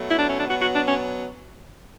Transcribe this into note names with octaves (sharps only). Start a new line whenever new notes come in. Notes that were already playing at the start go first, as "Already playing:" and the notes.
Already playing: B2 F#3 A3
E4
D4
C#4
D4
B2 F#3 B3 F#4
F#4
D4
C#4